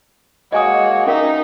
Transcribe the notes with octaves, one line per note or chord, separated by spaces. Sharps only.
G#3 A#3 F#4 C#5 D#5 G#5 D#6
C#4 D#4 A#4 E5 F5